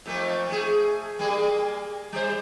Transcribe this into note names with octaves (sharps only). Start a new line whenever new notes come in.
F2 A3 A#3
A3 G#4
G3 A#3 G#4
G3 C5